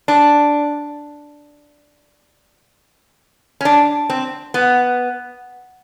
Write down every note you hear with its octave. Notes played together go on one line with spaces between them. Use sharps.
D4
C#4
D4
C4
B3